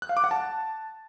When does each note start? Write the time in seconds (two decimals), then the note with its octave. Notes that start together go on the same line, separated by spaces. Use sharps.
0.02 F#6
0.09 F5
0.17 D6
0.24 F#5
0.31 A5